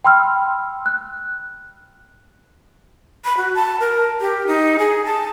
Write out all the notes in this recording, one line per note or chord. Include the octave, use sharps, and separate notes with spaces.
G5 B5 C6 E6 F6
F#6
B5
F#4
A5
A#4
G4
D#4
G#4
A5